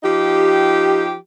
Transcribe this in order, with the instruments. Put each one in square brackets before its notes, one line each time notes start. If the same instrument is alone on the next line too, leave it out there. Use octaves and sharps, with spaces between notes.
[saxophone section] F3 D#4 G4